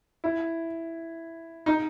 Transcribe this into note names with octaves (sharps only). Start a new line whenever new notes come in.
E4
D#4